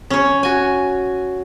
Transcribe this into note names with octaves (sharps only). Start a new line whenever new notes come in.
C#4 C#5
F#4 G#5